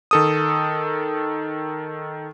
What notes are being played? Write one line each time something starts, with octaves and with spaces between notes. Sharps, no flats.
D#3 A4 D#6